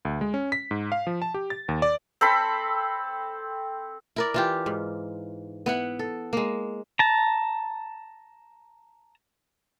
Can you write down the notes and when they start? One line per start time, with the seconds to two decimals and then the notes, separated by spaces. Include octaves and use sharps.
0.05 D2
0.21 G#3
0.34 C#4
0.52 B6
0.71 G#2
0.92 F5
1.07 F3
1.22 A5
1.34 G4
1.50 A6
1.69 D#2
1.82 D5
2.21 C4 A4 B5
4.16 E4 A#4 D5
4.34 E3 F4 G4
4.66 G#2
5.66 B3 E4 F#5
5.99 A4
6.33 G#3 A#3
6.99 A5 A#5